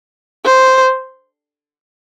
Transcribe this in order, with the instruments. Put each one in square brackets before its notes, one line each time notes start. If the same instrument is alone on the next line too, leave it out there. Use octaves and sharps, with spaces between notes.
[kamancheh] C5